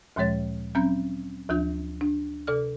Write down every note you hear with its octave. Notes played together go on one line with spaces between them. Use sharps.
D2 A#2 F3 G#3 C#5 A6
F#3 C4 C#4 A#5 G6
D2 F3 D4 F4 G6
D4
C3 A4 D5 F6